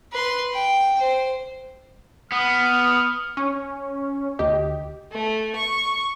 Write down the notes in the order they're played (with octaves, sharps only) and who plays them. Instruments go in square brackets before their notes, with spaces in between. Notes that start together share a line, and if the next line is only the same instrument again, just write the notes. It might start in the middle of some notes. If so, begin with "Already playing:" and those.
[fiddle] B4 C6
G5
C5
[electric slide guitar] B3 [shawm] D#6 [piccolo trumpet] F6
[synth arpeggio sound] C#4
[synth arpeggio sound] D2 G4 [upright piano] D#5
[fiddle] A3
C#6